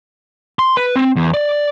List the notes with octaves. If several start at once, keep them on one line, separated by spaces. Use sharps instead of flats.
C6
B4
C4
E2
D5